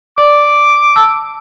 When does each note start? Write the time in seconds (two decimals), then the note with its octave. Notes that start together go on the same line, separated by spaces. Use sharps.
0.18 D5 D6
0.96 A5 E6